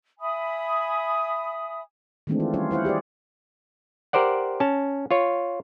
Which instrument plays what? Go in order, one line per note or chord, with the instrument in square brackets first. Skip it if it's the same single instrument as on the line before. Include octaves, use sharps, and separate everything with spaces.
[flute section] E5 G#5 B5 D#6
[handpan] D#3 E3 G#3 A3 C4 D4
F4
G3 C#4 F4 C#5
E4 C5 F5 F#5
G4 G#4 C5 D5
[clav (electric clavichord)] G4 A#4 C5 D5 F#5
C#4 A5
F4 C#5